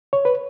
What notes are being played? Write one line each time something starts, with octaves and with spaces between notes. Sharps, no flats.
C#5
B4